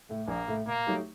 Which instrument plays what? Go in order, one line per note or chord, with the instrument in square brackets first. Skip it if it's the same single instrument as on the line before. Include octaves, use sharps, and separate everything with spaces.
[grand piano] A2 A3
[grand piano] A#1 [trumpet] A#3
[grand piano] A2 A3
[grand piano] A#2 [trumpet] A#3
[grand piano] F#3 A3 D#4 G4